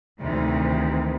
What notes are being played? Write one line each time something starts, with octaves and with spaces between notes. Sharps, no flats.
D2 C3 D#3 E3